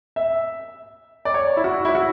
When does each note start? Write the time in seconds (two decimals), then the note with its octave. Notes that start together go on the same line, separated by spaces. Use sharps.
0.16 E5
1.25 D5
1.34 C#5
1.57 E4
1.64 F#4
1.85 E4
1.95 F#4